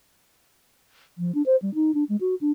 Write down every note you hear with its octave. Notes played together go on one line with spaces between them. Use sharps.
F3
D4
C5
G3
D#4
D4
G#3
F#4
D4